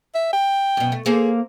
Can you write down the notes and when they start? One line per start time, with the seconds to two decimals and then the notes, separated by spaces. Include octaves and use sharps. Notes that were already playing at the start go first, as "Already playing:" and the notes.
0.15 E5
0.33 G5
0.77 F#2 B2
0.92 A3
1.06 A#3 G#4 A4 C5